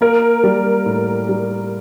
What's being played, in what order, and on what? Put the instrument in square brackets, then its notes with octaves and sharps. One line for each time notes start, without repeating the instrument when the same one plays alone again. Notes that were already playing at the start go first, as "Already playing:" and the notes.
[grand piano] A#3 [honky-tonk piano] A#4
[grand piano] G3
A2
G3